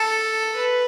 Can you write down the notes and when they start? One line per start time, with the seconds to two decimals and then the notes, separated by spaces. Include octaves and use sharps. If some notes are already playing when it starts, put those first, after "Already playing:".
Already playing: A4
0.54 B4